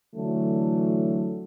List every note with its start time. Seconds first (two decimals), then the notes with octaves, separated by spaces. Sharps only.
0.14 D3 E3 F#3 A3